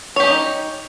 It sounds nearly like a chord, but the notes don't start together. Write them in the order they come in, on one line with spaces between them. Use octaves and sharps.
C#5 G4 C#4 D#5 D#4